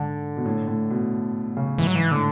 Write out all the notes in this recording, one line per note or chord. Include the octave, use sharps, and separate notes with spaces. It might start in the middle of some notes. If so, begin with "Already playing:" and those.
Already playing: G#2 D3
B2
A2
A2
B2
C#3
G#2 E3
F#3
E3
A2 D3